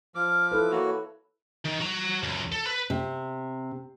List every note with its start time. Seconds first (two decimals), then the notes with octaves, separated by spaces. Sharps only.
0.15 F3 D6 F6
0.52 E4 A4 B4
0.72 A#3 F#4 C#5
1.65 D#3
1.80 F#4 A#5
2.23 C#2 F#2
2.52 A4
2.66 B4
2.90 C3